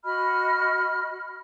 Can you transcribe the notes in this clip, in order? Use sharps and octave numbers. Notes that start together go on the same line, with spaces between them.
F#4 D#5 B5 F6